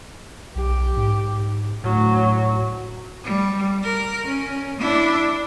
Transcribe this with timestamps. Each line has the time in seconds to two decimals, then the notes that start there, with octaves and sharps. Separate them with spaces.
0.55 B1 G4
0.96 G#2
1.83 D2 A2 F#3
3.24 G3
3.84 A#4
4.27 C#4
4.79 D4 E4